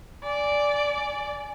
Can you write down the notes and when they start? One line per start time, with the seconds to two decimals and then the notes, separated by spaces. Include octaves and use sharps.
0.24 D5 G#5